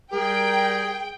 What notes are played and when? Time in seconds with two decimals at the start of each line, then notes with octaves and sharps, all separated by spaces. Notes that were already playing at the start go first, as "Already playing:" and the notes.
0.13 G3 G#4 A#4 G5